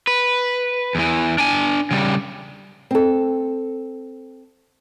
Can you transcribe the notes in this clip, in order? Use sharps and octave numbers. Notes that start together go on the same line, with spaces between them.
B4
E2 E3
D4 G#5
C#3 G3
C4 A4